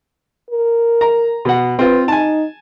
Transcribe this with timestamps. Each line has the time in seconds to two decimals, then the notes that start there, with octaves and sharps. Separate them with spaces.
0.51 A#4
1.01 A#5
1.45 B2 F#5
1.79 C4 F4 B4
2.08 D#4 G#5 A5